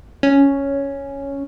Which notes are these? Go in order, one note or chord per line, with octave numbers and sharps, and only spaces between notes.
C#4